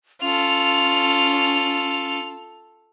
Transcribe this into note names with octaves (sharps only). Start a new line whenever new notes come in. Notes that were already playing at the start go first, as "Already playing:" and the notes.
C#4 F4 A4 F7